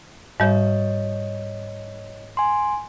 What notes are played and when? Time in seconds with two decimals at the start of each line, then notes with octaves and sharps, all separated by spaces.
0.40 G#2 G3 C#5 D#5
2.37 G#5 C6